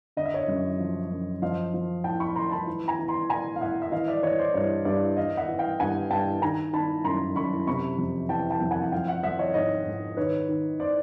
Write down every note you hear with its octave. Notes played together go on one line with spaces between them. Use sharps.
D3 D#5
E5
C#5 D#5
F#2
F3
F#2
F3 D#5 F5
F3
A2 G5 A5
B5 C#6
A2 A#5 C6
A5 B5
E3
G#5 A#5
E3
A#5 C6
A2 G#5 A#5
F5
A2 E5 F#5
E5
E3 D#5 F5
D5 E5
E3 C#5 D#5
C5 D5
G2 C#5 D#5
G2 D5 E5
E3 D#5 F5
E5 F#5
E3
F5 G5
G2 F#5 G#5
G2 G5 A5
D#3 G#5 A#5
D#3 A5 B5
F#2 A#5 C6
F#2 B5 C#6
C3 B5 C#6
F2
E3 G5 A5
G5 A5
F2
F#5 G#5
F#5
F3 F5 G5
E5 F#5
F3 E5 F#5
C#5 D#5
G#2 C#5 D#5
G#2
D#3 B4 C#5
D#3
C5 D5